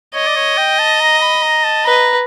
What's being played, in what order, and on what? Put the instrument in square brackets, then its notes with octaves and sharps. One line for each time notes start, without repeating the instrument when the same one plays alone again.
[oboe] C#5 [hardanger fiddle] D#5
[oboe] D5
C#5
G5
A5
A#5
B5
A#5
A5
[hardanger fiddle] B4 [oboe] A#5